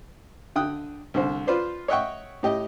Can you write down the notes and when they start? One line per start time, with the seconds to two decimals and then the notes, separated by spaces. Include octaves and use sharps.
0.56 D3 G5 D#6 F#6
1.14 C2 D3 C5
1.47 F4 B4 C5 D5
1.88 C#5 D#5 E5 F#5 G5 C#6
2.43 A2 G4 D#5